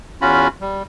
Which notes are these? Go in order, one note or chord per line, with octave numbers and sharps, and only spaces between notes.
E2 C#4 F4 F#4 B5
G3